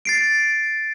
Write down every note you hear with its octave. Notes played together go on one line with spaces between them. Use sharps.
A6 C7 D7